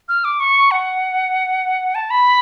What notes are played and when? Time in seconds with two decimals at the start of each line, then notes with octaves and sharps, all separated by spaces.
0.09 F6
0.24 D6
0.40 C#6
0.71 F#5
1.95 A5
2.10 B5